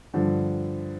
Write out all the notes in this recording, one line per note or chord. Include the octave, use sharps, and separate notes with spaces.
G2 D3 F3